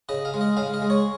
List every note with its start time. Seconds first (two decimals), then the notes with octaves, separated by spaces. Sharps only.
0.09 C#3 D#5
0.25 F5
0.34 G#3
0.41 D#5
0.57 C#3 F5
0.74 D#5
0.82 G#3
0.90 C#5